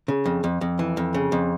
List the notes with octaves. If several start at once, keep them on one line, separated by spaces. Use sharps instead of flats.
C#3
F2
F2
F2
E3
F2
C#3
F2